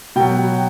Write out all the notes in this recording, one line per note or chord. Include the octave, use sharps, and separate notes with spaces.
B2 F#3 G5